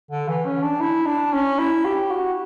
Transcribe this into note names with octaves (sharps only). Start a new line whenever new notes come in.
D3
E3
C#4
D4
E4
D4
C#4
E4
G4
F#4